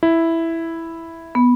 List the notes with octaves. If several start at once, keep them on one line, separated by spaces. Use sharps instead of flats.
E4
B3